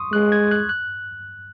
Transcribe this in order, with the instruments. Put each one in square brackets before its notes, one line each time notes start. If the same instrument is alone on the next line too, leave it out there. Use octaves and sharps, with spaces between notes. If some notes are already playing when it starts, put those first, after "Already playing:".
Already playing: [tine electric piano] C6 C#6 D#6
[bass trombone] G#3 [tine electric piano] F#6
[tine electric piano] G#6
F#6
F#6